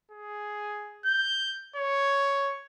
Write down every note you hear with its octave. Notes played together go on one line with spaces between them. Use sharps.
G#4
G6
C#5